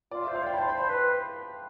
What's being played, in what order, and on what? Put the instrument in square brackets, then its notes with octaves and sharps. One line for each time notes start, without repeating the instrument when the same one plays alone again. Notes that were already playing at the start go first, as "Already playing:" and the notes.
[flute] F4 [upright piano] D5
[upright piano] E5
[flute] C5
[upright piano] F5
[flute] D5 [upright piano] G5
[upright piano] B5
[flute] C5 [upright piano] A5
[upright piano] B5
[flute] C5
[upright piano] C6
[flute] B4